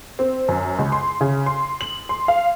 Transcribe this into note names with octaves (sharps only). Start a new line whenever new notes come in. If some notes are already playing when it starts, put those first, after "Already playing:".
C4
F#2
C#2
C6
C#3
C6
F#7
C6
F5